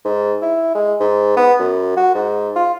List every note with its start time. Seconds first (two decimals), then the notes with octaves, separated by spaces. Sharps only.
0.05 G#2
0.42 E4
0.75 G#3
1.00 G#2
1.37 B3
1.59 F#2
1.97 F#4
2.15 G#2
2.56 F4